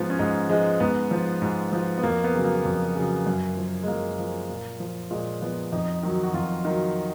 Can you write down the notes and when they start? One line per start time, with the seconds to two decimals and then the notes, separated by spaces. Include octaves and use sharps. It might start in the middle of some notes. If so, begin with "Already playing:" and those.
Already playing: G#2 F3 B3
0.10 C#4
0.19 G#2 D#4
0.49 F3 G#3
0.80 G#2 B3
1.11 F3
1.42 G#2
1.72 F3
1.98 B3
2.03 F2 A#3
2.24 B3
2.34 C#3 F#3
2.44 A#3
2.65 F2
2.95 C#3 F#3
3.26 F#2
3.57 F3
3.83 G#3
3.88 F#2 A#3
4.19 F3
4.50 A#2
4.80 F3
5.11 A#2 G#3
5.42 F3 B3
5.72 F2 D#4
6.03 D#3 F#3
6.23 F#4
6.34 F2 F4
6.65 D#3 F#3